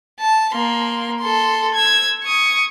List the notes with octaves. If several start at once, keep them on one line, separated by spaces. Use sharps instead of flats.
A5
A#3 C6
A4 C6
E6 G#6
C#6 D#6